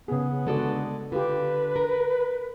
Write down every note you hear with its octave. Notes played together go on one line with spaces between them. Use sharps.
C#3 B3 G#4
D3 G#3 F#4 A4 D5
D3 F4 G4 B4
A#4